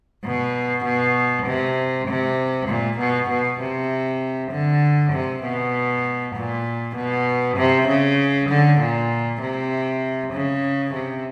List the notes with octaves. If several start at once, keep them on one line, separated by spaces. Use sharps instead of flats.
B2
B2
C3
C3
A#2
B2
B2
C3
D3
C3
B2
A#2
B2
C3
C#3
D3
A#2
C3
C#3
C3